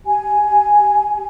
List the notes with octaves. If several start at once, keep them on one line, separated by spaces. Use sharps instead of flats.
G4 G#5
G4
G4
G4